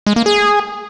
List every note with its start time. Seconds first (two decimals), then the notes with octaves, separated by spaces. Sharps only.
0.07 G#3
0.16 A#3
0.26 G#4